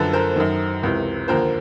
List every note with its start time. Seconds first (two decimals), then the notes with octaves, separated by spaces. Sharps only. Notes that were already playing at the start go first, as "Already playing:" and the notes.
Already playing: F#2 D3 F3 A4 B4
0.13 A#4 C5
0.36 F#2 D#3
0.82 C#2 C3 E3
1.28 D#2 D3 F3 A#4 C5